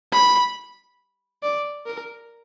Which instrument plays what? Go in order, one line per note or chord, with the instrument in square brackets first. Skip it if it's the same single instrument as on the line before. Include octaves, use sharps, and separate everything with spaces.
[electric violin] B5
D5
A#4